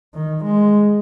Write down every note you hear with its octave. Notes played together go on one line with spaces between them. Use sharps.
D#3
G#3